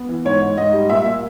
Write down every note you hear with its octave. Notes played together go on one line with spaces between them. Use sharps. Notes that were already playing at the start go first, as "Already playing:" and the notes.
Already playing: B3
E3
G#2 C#5
G#2
G#2 D#5
G3
A#2 E5
A#2